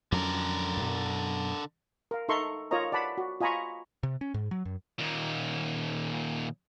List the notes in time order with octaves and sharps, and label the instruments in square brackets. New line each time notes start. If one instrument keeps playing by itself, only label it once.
[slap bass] F2 F#3 C#4 [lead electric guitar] D3 A#4
[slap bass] F#2 B2
[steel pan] A#4 F5
D#4 A4 E5 A#5 C6 C#6
F4 A#4 C#5 D#5 A#5
D5 F#5 A5 B5
F#4
F4 D#5 G#5 A#5 B5 C#6
[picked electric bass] C3
C#4
G#2
F#3
F#2
[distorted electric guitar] D#2 A#2